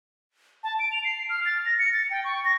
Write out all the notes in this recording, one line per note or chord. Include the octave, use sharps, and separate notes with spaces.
A5
D7
F7
C7
F6
A6
A#6
C#7
A6
G5
C#6
A#6